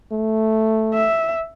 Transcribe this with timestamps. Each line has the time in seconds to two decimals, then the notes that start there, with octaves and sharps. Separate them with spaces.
0.12 A3
0.94 E5